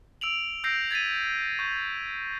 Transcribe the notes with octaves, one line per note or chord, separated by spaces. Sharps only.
E6 D7 F7 F#7
E6 G6 A#6 C7 D7
G#6 A6 B6 D#7
C#6 G6